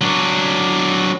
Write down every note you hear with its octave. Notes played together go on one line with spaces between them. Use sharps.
F#3 D4